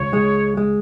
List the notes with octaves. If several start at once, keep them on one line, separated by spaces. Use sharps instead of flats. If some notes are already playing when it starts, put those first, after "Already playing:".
Already playing: C#2 C#5
G#3
G#3